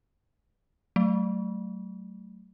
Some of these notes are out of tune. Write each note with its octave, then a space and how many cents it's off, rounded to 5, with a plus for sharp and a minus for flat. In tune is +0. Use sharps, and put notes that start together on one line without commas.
F#3 +30 A3 +0